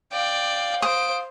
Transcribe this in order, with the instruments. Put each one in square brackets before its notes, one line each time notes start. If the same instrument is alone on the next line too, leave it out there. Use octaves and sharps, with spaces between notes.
[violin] D5 G5 [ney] F5
[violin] C5 D7 [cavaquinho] D#6